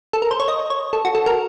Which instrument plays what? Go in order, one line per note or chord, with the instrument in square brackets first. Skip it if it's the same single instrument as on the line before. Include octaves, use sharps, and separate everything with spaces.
[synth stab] A4
A#4
C5
C#5
D#5
C#5
A4
F#4
A4
A#4